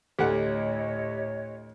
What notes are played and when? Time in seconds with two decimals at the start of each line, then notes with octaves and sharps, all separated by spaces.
0.19 D2 A2 A3 G4 C#5 D#5 F#5